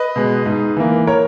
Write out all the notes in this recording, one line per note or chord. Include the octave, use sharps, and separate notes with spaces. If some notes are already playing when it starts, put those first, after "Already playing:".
Already playing: B4 D#5
B2 G#3
G#2
E3 A#3
A#4 C#5